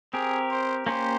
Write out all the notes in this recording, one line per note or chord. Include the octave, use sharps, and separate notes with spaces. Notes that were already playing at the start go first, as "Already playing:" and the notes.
C4 G4 G#4 A#4
C5
A#3 C#4 G4 C5